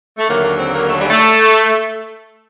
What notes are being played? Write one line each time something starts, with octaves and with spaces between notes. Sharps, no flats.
A3
D#2 D3 F#3 A#3
A#3
C4
A#3
A3
G3
A3